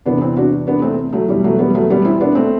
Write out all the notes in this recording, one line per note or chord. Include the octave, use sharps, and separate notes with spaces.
E2 C3 E3 B3 D4
C4 E4
D4 F#4
B3 D4
A3 C4
F#3 A3
E2 B2 E3 G3
F#3 A3
G3 B3
F#3 A3
G3 B3
C4 E4
B3 D4
A3 C4